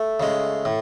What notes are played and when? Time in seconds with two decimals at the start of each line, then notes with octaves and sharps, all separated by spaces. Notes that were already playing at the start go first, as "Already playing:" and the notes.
Already playing: A3
0.20 C#3 G#3
0.65 A2